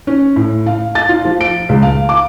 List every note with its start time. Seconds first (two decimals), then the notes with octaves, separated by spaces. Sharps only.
0.07 C#4
0.36 A2
0.66 F5
0.95 A6
1.09 F4
1.25 F3
1.41 D7
1.69 C#2
1.82 F5
2.09 D6